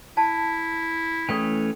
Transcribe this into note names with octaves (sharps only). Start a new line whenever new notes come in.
E4 A5
E3 A3 C#4 A4 G5